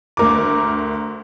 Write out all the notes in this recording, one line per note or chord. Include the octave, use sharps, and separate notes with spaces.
D2 A#4 D6